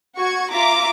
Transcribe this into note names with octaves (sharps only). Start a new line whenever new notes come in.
F#4 C#6 G#6
F4 E5 A#5 D6